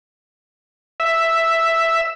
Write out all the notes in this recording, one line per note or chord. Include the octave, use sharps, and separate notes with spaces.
E5